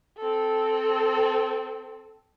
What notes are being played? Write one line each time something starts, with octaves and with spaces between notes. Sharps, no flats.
C4 A4